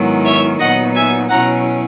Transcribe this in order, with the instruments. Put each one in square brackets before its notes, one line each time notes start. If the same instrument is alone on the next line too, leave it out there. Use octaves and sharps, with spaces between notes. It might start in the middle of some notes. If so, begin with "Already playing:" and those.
Already playing: [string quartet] G#2 D#3 F#3 B3 E4
C#5 E5
A#2 F#3 B3 D#4 D#5 F#5
E5 G#5
B2 F#3 C#4 E4 F#5 A#5